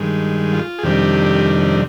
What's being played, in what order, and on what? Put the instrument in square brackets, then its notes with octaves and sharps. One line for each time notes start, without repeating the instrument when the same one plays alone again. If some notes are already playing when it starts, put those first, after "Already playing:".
Already playing: [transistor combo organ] G2 D#3 G#3
F4
G#4
F2 C3 D#3 G3 D4 G4